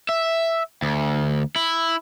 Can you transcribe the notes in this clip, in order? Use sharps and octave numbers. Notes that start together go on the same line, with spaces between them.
E5
D2
E4